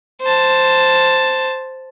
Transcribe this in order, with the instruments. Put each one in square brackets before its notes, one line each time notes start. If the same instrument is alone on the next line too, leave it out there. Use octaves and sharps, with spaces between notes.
[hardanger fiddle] C5 A5